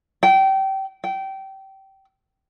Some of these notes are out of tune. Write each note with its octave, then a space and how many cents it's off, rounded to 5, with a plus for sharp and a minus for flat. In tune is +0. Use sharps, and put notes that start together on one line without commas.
G5 -25
G5 -20